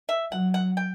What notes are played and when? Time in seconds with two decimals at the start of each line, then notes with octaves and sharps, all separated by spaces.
0.09 E5
0.32 F#3 F#5
0.54 F#5
0.77 G5